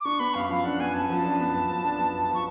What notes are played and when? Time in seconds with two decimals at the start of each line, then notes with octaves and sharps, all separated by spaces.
0.01 D6
0.05 D4 C#6
0.20 B3 B5
0.35 F#2 F5
0.49 F3 F5
0.64 D4 F#5
0.80 B3 G#5
0.94 F#2 A5
1.09 F3 A5
1.25 D4
1.40 B3
1.55 F#2
1.70 F3
1.84 D4
1.99 B3
2.15 F#2
2.30 F3 C#6